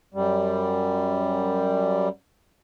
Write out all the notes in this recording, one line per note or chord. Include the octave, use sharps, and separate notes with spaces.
F#2 G3